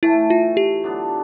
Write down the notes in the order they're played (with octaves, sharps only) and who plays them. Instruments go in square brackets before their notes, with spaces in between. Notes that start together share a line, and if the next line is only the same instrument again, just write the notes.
[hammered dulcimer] A2 E3 A3 [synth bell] E4
[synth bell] F4
G4
[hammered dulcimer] D3 F#3 B3 D4